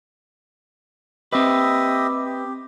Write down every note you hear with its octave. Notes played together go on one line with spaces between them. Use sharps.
C4 G4 B4 D#5 E5
G4